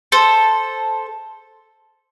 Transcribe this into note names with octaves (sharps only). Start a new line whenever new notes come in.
A4 C5